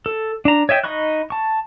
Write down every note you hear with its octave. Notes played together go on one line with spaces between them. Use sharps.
A4
D4 A#5
C#5 D#5 E5 G5
D#4 D#5 B5 C#6 F#6
A5 C#6